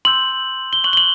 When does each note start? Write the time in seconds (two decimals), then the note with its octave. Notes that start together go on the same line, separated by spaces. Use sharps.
0.05 C6 E6 G6 F#7
0.73 G7
0.84 C#6 F#6 F#7
0.93 G7
0.97 F#7